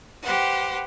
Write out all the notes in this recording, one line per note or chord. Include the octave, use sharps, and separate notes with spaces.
G4 B4 C5 F#5